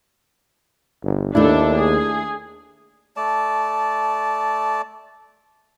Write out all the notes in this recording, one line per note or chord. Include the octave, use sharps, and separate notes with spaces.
G1
D#2 A3 D4 E4 A4
G#4
A3 D5 A5